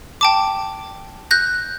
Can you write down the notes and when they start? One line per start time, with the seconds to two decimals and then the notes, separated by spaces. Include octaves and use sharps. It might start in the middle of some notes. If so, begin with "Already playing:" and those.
0.21 G5 A5 D6
1.31 F#6 G6 A#6